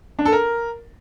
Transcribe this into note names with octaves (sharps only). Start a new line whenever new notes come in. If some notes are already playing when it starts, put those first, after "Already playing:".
D4
A4
A#4